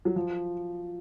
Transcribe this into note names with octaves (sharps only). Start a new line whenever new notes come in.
F#3
F3